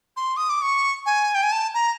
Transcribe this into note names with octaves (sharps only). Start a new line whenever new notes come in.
C6
D#6
D6
C#6
G#5
G5
G#5
A5
A#5